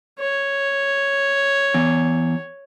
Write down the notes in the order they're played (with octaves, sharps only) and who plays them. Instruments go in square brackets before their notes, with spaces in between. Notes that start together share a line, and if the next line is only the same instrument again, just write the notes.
[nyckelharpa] C#5
[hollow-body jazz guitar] E2